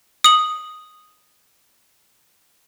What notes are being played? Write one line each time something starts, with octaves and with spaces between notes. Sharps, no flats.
D#6 F#7